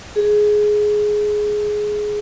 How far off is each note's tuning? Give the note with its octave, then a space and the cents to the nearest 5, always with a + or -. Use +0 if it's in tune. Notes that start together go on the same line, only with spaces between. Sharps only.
G#4 +10